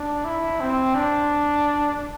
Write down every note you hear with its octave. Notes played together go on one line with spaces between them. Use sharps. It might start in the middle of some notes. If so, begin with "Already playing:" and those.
Already playing: D4
E4
C4
D4